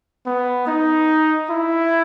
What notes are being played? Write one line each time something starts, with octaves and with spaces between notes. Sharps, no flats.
B3
D#4
E4